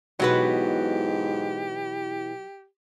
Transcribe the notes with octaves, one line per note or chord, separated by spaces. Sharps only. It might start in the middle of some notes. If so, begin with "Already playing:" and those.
G#2 B2 E3 F#3 E4 F#4 G4 B4